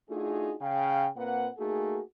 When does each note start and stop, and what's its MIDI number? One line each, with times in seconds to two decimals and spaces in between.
0.10 0.54 57
0.10 0.54 62
0.10 0.54 63
0.10 0.54 65
0.10 0.54 66
0.10 0.54 68
0.62 1.08 49
0.62 1.08 77
0.62 1.08 79
1.17 1.49 46
1.17 1.49 58
1.17 1.49 60
1.17 1.49 71
1.17 1.49 78
1.58 2.01 57
1.58 2.01 58
1.58 2.01 63
1.58 2.01 66
1.58 2.01 68